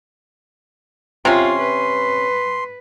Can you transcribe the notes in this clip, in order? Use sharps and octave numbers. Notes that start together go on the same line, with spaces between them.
C3 C#4 F4 C6
B4